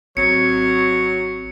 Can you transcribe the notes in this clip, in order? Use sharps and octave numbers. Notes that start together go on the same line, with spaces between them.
G#1 F#3 C4 C#5 A#5 C#7